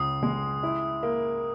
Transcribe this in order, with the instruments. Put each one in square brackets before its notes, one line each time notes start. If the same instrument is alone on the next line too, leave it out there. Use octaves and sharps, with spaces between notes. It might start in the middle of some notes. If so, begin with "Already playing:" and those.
Already playing: [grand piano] C#2 [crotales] D#6
[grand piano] G#3
E4
A#3